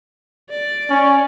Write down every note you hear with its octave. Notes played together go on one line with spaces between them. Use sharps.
D5
C#4